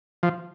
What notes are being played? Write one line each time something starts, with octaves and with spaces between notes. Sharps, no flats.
F3